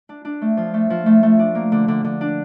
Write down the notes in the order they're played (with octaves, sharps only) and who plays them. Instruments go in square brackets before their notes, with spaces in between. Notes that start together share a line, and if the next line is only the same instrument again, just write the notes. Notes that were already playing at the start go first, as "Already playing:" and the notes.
[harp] D4
D4
A3
F3
A3
F3
A3
A3
D4
A#3
D3
D3
D3
D4